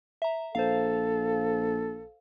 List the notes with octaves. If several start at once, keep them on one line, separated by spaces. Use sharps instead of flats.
E5 A#5
A#1 A4 C5 F5